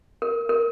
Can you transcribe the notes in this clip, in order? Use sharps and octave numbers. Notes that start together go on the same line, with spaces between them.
A#4
A#4